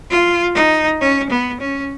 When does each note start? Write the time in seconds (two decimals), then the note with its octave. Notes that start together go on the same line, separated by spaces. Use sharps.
0.10 F4
0.55 D#4
1.01 C#4
1.30 B3
1.61 C#4